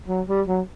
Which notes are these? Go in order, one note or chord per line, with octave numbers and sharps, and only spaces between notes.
F#3
G3
F#3